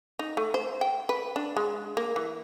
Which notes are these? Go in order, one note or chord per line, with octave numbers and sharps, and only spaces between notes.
D#4
A3
C5
G5
B4
D4
G#3
A#3
E3